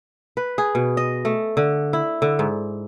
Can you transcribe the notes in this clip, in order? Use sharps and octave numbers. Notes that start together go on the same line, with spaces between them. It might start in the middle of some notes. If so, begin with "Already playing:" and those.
B4
G#4
B2
D#5
A3
D3
E4
D3
G#2